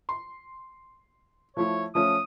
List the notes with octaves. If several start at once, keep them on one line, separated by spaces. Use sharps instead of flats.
C6
F3 A3 E4 C#5
F3 A3 C#4 D#6